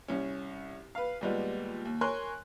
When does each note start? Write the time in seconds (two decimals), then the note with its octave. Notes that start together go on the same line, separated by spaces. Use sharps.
0.08 C2 C#4
0.95 B4 F5
1.21 D#2 A#2 G3 G#3 B3
1.85 D#2
2.01 A#4 C#5 G#5 C6 F#6